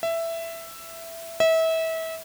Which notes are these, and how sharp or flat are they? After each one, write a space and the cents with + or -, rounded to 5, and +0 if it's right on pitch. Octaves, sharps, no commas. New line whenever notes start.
E5 +10
E5 -30